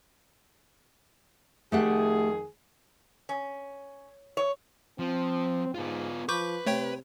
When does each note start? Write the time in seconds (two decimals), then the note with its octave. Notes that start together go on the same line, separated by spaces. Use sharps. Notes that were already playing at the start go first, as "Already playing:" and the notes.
1.72 F2 D#3 A3 G4 G#4 F#5
3.29 C#4
4.37 C#5
4.99 F3 C4
5.75 G#2 B3 F4
6.29 F3 B4 C#6 D6 G6
6.66 C3 A3 C#5 G5